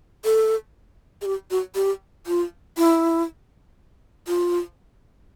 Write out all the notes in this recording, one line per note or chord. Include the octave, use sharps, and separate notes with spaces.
A4
G#4
G4
F#4
G4
F4
E4
F4